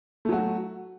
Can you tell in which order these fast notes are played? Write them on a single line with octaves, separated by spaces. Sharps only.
A3 F#3 F#4